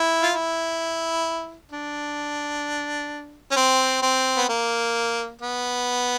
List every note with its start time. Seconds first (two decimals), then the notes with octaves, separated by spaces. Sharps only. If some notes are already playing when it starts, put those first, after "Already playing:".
Already playing: E4
0.23 F4
0.33 E4
1.72 D4
3.51 C#4
3.57 C4
4.02 C4
4.38 B3
4.49 A#3
5.41 B3